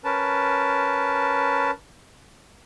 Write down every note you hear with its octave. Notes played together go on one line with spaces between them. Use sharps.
C#4 A#4 B4 A5